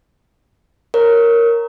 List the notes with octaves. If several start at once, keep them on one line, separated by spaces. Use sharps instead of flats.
A#4 C#5